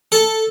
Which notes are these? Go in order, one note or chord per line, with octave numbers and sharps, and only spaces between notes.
A4